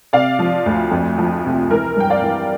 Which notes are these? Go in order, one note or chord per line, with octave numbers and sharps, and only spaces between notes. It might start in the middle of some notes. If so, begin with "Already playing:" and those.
C3 D5 F5
F3
D2
F2
F3
C3
E3 A#4
G2 G5
D5 F5
E3